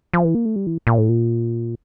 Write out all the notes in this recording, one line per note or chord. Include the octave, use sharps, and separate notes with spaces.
F3
E3
A#3
A3
G3
E3
A#2
A2
A#2